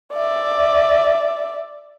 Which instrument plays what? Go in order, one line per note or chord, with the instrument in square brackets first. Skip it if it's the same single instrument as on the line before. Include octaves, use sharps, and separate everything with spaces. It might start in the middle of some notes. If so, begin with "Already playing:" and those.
[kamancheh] D5 E5